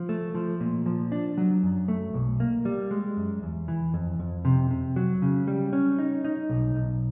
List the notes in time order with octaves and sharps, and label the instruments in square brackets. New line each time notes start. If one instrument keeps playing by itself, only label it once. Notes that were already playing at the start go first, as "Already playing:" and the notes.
Already playing: [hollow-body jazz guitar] F3
A3
F3
A#2
F3
D4
F#3
F#2
A3
B1
A#3
G3
G#3
F#2
E2
E3
F2
F2
C3
C3
F#3
C#3
G3
C#4
D#4
D#4
B1
B1